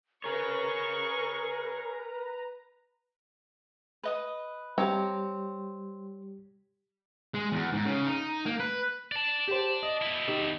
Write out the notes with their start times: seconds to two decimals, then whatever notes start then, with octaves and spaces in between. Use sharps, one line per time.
0.24 G#4 A#4 B4 C#5 A#5 C#6
4.03 B4 D#5 D#6
4.78 G3 C4 G4 C#5 A#5 D6
7.34 G#3
7.52 E2
7.73 G#2
7.85 C#3
8.07 D#4
8.46 A#3
8.60 B4
9.12 D5 A5
9.48 G4 C5
9.83 D#5
10.02 B2 E4
10.27 D#3 G4 D#5